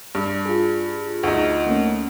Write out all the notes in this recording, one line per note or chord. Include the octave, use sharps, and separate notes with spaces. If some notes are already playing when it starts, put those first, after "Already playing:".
G2 D5
F4 G#4
D2 D#4
A3 A#3 C#4